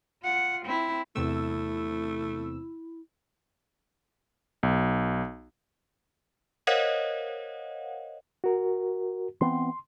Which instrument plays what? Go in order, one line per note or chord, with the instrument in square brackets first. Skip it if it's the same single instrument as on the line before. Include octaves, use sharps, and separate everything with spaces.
[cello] F4 F#5
C4 E4
[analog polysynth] E2 C3 E6 [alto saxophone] A3 [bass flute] E4
[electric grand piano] B1
[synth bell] A#4 C5 C#5 D#5 F5 F#5
[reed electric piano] F#4 A#4
[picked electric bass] E3 B3 C4 [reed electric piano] C6